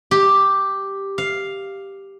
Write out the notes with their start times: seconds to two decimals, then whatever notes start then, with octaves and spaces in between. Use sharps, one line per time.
0.11 G4
1.18 F5